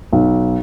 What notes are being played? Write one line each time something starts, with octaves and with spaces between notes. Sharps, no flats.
B1